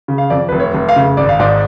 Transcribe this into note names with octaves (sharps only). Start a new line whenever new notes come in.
C#3
F5
F2 D5
F1 B4
C#5
F1
F5
C#3
G#1 D5
F5
G#2 D5